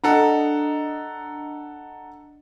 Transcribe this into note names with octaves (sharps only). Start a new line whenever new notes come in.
D4 A4 D#5 F#5 A#5